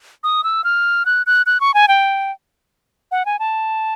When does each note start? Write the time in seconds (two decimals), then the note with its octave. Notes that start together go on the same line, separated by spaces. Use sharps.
0.24 D#6
0.44 E6
0.64 F6
1.06 F#6
1.26 F#6
1.46 F#6
1.61 C#6
1.74 G#5
1.88 G5
3.11 F#5
3.26 G#5
3.39 A5